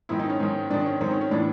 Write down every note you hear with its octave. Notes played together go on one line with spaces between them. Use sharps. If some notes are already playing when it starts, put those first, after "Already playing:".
G#2 D#3 E4
D#4
C#4
G#2 D#3
G#2 D#3 D4
C#4
G#2 D#3 C4
C#4
C#4
A2 E3 D4